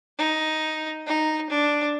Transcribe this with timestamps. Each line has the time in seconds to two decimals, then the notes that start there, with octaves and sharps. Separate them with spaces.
0.18 D#4
1.07 D#4
1.50 D4